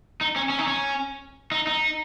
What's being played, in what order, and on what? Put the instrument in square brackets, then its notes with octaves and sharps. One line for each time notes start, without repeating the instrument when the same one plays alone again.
[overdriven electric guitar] D#4
C#4
C#4
D#4
C#4
D#4
D#4